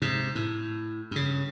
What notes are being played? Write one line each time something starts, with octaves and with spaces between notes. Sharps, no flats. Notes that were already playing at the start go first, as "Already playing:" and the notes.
G#2 C3
A2
G2 C#3